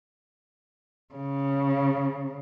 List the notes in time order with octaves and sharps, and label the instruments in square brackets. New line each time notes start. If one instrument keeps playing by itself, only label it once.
[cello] C#3